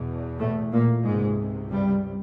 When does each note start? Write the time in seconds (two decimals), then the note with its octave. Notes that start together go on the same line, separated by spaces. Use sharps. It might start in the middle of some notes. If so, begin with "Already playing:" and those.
Already playing: E2 B2
0.39 A2 A3
0.72 A#2 A#3
1.04 C#2 G#2 C3 G#3
1.70 G2 G3